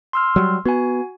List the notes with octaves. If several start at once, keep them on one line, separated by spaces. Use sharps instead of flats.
C6 E6 F6
F#3 G3
B3 F#4 G#5